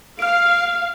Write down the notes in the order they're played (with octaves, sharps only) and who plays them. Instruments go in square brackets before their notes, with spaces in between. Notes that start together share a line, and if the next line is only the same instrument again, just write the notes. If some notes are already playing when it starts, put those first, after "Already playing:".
[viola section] F5 [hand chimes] F6 D7